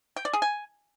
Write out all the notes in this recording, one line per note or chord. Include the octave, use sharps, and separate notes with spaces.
G5
D5
G#4
G#5